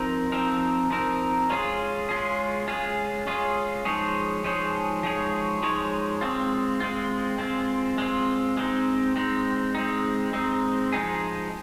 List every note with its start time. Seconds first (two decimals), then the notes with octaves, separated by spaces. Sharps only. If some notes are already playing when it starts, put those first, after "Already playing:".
Already playing: F3 C4 D#4 A#4
0.32 F3 C4 D#4 A#4
0.90 F3 C4 D#4 A#4
1.50 G#3 C#4 F4 G#4
2.09 G#3 C#4 F4 G#4
2.68 G#3 C#4 F4 G#4
3.27 G#3 C#4 F4 G#4
3.85 F3 G#3 D#4 G#4 C#5
4.44 F3 G#3 D#4 G#4 C#5
5.03 F3 G#3 D#4 G#4 C#5
5.62 F3 G#3 D#4 G#4 C#5
6.21 G#3 C4 F4
6.80 G#3 C4 F4
7.38 G#3 C4 F4
7.98 G#3 C4 F4
8.57 G#3 C4 D#4
9.16 G#3 C4 D#4
9.75 G#3 C4 D#4
10.33 G#3 C4 D#4
10.92 F3 G#3 D#4 G#4